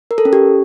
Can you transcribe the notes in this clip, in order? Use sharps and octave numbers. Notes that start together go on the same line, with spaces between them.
A#4
A4
C#4
G4